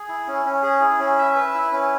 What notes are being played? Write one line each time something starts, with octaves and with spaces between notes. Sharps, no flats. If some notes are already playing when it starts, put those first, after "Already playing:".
Already playing: G#4
E4
C#4
C#4
G#4
E4
C#4
E5
B4
E4
C#4